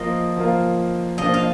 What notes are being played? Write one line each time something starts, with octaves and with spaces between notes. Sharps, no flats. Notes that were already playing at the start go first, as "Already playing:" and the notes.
Already playing: F3 A#3 F4 A#4 D#5 F5
F3 A#3 F4 A#4 F5
F3 A#3 D4 D#5
F5